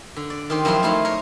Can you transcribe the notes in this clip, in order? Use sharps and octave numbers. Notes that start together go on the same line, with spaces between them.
D3
D5
D#3 G4 C5
F#2 F3 F#3 E4 C5 C6
A3 D#4 E4 C5 F5
A#4 C#5